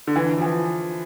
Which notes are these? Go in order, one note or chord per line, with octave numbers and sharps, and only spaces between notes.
D3
E3
F3
E3